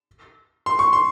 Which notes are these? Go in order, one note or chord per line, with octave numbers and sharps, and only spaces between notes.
C6
C#6
C6